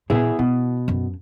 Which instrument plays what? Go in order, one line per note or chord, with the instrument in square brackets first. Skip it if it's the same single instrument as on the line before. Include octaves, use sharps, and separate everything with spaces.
[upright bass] A#2 [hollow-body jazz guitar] B3 E4 G#4
[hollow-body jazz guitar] B2 [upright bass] E4
[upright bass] F#2